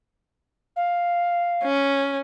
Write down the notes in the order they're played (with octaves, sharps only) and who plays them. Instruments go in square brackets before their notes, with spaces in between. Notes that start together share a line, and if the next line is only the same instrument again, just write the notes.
[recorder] F5
[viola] C#4